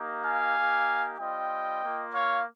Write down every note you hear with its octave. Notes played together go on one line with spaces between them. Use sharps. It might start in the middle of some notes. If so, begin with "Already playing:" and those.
Already playing: A#3 D#4 G4
F5 G#5
A#3 D#4 G4
G3 C4 F4 D#5 G5
A#3 F4
C#5 F5